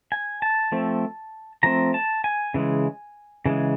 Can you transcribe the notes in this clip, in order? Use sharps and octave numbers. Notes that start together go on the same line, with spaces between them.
G#5
A5
F3 A3 C4
F3 A3 C4 A#5
A5
G#5
C#3 E3 G#3
C#3 E3 G#3